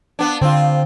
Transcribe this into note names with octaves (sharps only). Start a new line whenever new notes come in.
B3 D4
D3 C4 F4